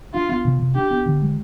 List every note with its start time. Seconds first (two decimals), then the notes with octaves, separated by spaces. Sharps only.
0.14 D4 F4
0.29 B3
0.45 C3
0.60 C3
0.75 D4 G4
0.91 B3
1.06 D3
1.22 G#3